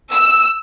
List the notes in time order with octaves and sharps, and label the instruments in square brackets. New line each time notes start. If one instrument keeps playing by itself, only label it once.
[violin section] E6